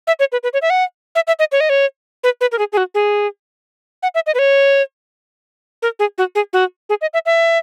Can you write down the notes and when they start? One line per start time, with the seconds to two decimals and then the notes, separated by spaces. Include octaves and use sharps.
0.07 E5
0.20 C#5
0.32 B4
0.43 B4
0.53 C#5
0.62 E5
0.70 F#5
1.15 E5
1.27 E5
1.39 D#5
1.52 C#5
1.60 D#5
1.69 C#5
2.24 B4
2.41 B4
2.52 A#4
2.59 G#4
2.72 G#4
2.77 F#4
2.95 G#4
4.03 F#5
4.15 E5
4.26 D#5
4.35 B4
4.39 C#5
5.82 A#4
5.99 G#4
6.18 F#4
6.35 G#4
6.53 F#4
6.89 G#4
7.01 D#5
7.14 E5
7.26 E5